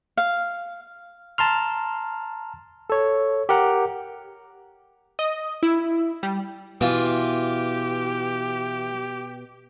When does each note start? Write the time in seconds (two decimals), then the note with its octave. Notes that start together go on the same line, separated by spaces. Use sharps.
0.17 F5
1.38 A5 A#5 C6 F6
2.90 A4 C#5
3.49 G4 A#4 F#5 A#5
5.19 D#5
5.63 E4
6.23 G3
6.81 B2 E3 F4 G4